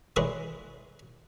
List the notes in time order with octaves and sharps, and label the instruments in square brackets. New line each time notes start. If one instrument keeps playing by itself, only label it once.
[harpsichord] E3 G#3 G#4 B4 C#5 D5